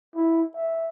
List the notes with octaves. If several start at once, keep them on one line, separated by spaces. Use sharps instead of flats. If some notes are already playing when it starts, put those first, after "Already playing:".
E4
E5